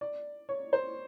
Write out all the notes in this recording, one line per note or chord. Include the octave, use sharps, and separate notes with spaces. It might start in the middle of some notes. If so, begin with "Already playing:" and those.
D5
C#5
C5